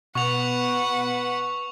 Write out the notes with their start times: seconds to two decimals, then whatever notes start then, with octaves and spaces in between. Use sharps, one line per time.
0.15 B2 B3 B4 F#5 C#6 F7